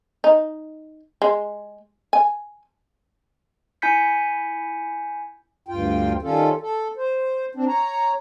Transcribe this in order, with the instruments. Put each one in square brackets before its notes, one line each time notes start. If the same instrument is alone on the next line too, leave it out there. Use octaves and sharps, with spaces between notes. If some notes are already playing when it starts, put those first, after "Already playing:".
[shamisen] D#4
G#3
G#5
[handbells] E4 G#5 B5 G6 B6 C#7
[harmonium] D2 G2 F4 G5
D#3 G3 C#4 F4 A4
A4
C5
C4 D4
C#5 A#5